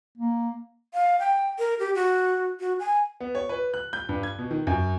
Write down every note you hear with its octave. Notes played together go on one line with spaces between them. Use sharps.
A#3
F5
G5
A#4
G4
F#4
F#4
G#5
B3
C#5
B4
F#6
G6
G2
G#6
B2
D#3
F#2